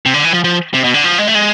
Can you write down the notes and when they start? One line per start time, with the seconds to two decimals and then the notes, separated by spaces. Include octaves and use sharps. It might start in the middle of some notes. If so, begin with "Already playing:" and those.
0.06 C3
0.14 D3
0.24 E3
0.34 F3
0.44 F3
0.74 C3
0.84 B2
0.94 D3
1.04 F3
1.18 G#3
1.27 A3
1.35 G#3